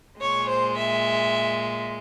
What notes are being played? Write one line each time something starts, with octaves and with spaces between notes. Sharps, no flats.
A#2 G#3 C#5
C5
E5